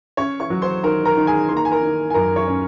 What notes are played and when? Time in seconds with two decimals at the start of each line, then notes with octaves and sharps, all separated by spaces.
0.17 C#4 C#5 C#6
0.40 C#5 C#6
0.50 F#3
0.62 C5 C6
0.84 D#3 A#4 A#5
1.05 A#4 A#5
1.17 D#3
1.27 G#4 G#5
1.49 A#3 C6
1.57 A#5
1.65 G#5
1.72 A#4 A#5
1.82 D#3
2.10 G#5
2.14 F#2 A#4 A#5
2.36 C#5 C#6
2.47 C#4